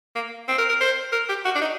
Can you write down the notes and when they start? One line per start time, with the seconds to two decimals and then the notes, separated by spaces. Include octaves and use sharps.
0.15 A#3
0.48 C4
0.58 A#4
0.69 A#4
0.81 C5
1.12 A#4
1.29 G4
1.45 F#4
1.55 D4
1.61 D#4